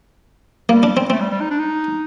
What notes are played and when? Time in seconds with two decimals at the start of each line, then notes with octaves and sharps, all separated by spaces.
0.69 G3 A#3
0.83 D4
0.97 C4
1.10 A3 C4
1.21 G3
1.31 G3
1.41 D#4
1.51 D4
1.59 D#4